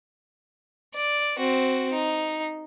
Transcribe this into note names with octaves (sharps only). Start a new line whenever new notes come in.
D5
C4 F#4
D#4